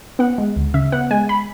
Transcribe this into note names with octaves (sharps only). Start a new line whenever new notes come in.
B3 F#5
G#3
D2
C#3 E5
B3 F#5
G#3 G#5
B5